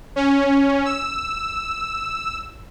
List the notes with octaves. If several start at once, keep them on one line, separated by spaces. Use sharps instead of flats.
C#4
E6